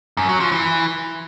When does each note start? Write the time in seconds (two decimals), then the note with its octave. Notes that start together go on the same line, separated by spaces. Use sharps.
0.17 F#2
0.29 F#3
0.40 F3
0.52 E3